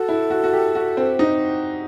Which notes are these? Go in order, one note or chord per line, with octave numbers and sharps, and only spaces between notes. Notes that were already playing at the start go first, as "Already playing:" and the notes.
Already playing: F#4 A4
E4
F#4
F#4
G4
F#4
C4
D#4